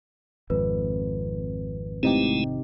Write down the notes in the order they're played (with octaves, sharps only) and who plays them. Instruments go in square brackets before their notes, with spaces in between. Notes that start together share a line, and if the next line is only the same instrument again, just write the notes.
[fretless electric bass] G#1 F2 [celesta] B4
[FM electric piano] C3 D#4 G4 [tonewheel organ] G#3 A3 E4